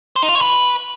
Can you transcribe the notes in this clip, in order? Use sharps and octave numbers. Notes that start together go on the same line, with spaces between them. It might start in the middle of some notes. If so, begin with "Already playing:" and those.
C5
D#4
F4
C#5
B4